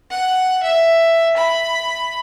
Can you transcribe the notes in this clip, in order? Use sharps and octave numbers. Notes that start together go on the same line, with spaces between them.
F#5
E5
B5